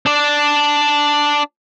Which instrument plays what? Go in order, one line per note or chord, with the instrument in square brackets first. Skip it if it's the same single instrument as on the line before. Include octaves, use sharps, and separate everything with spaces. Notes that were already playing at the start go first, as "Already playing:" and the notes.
[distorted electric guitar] D4 D5